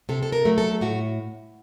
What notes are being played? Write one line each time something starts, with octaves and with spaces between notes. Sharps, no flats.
C3 A4
A4
A#4
F#3 A3
A4
A2 F#4